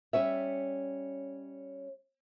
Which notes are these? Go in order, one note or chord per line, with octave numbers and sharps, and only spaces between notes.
G3 C#4 C#5 E5